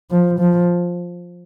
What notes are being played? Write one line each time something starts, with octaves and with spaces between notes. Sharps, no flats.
F3
F3